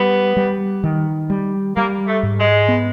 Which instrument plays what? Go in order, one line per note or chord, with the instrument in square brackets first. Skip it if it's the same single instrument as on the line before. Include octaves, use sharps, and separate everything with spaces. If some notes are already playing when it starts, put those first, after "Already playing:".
Already playing: [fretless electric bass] G3 [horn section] B3
[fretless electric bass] G3
D#3
G3
[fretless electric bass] G3 [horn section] A#3
[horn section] A3
[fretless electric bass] G#2
[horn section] G#3
[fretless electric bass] B3